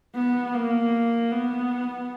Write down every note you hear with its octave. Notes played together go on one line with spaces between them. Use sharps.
B3
A#3
B3